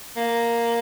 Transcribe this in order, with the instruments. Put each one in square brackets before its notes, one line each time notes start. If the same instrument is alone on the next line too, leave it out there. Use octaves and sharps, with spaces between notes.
[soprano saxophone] A#3